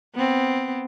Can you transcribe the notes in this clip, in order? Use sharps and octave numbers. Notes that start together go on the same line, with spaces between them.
B3 C4